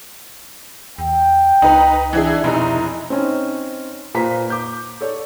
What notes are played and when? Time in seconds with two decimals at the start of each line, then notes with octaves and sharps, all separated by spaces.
0.98 E2 G5
1.62 C#2 D#4 B4
2.13 E3 D4 E4 G#4
2.44 F1 B2 D#4 E4
3.10 C4 C#4 D#4
4.14 A#2 B4 C5 A#5 B6
4.50 D6 G6
5.01 A4 C#5 D5